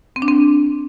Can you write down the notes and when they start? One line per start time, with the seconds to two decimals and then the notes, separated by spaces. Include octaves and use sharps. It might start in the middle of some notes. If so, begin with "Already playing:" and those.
0.16 C4
0.22 D4
0.28 C4